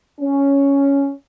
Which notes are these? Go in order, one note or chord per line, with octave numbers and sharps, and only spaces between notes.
C#4